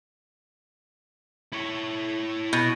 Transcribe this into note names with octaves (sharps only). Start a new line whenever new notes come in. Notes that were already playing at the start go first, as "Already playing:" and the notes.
E4 C#5
B2